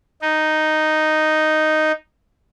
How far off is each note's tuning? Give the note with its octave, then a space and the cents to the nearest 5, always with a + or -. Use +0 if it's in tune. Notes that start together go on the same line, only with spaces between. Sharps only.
D#4 -5